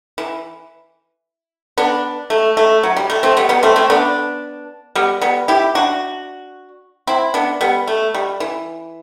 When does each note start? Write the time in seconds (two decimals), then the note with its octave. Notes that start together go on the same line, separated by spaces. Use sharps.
0.18 E3
1.78 B3 D4
2.30 A3
2.57 A3
2.83 F#3
2.97 G3
3.10 A3
3.23 A3 C4
3.37 G3 B3
3.49 G3 B3
3.63 A3 C4
3.76 A3 C4
3.90 B3 D4
4.95 G3 B3
5.22 G3 B3
5.48 E4 G4
5.75 D4 F#4
7.07 C4 E4
7.34 B3 D4
7.61 G3 B3
7.88 A3
8.14 G3
8.40 E3